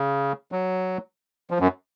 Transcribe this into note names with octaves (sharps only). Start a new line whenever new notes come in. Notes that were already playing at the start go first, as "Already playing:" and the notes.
Already playing: C#3
F#3
F3
F#2